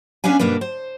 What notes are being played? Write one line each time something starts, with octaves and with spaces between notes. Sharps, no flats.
B3 C#4 D4 B4 F5 G#5
D2 G2 B2 A#3 D4 B4
C5